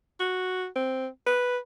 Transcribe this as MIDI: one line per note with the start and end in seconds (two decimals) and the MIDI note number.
0.20 0.66 66
0.76 1.07 60
1.26 1.57 71